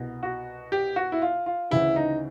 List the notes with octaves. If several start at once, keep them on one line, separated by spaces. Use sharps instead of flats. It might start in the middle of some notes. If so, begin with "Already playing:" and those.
Already playing: C2 B2
F#4
G4
F#4
E4
F4
F4
D2 C#3 E3 E4
D#4